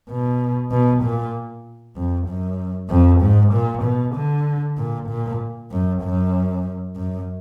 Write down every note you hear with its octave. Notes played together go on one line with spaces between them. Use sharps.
B2
B2
A#2
F2
F#2
F2
G#2
A#2
B2
D3
A#2
A#2
F#2
F#2
F#2